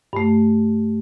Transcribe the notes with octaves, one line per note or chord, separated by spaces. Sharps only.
G2 A3